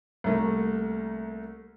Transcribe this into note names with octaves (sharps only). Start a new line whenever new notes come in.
C2 A3 A#3